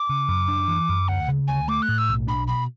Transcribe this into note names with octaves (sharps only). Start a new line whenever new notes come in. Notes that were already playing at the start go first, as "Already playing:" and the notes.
Already playing: D6
C#3
F#2
D4
E3
F#2
D2 F#5
C#3
D2 G#5
A3 D6
F#6
A2
E6
B1
D4 B5
B2 B5